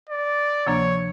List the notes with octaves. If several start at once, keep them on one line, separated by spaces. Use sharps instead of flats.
D5
D2 C3 F3 A#3 D4 C#5